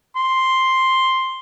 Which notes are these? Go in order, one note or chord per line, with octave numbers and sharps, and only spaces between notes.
C6